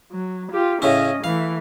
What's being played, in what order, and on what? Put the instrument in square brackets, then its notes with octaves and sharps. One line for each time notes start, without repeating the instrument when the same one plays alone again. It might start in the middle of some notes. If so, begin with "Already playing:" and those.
[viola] F#3
F4 G4
[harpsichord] A2 C#3 E4 [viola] C#4 D#5
[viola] E3 A3 [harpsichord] F5